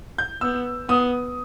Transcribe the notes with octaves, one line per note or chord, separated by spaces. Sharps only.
G6
B3 E6
B3 D#6